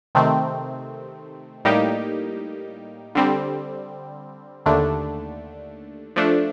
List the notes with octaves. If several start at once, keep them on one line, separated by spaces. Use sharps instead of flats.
C3 D#3 A3 C4
A2 G3 A#3 D#4 G4
D3 G3 C4
D#2 D3 A3 D4
F3 A3 D4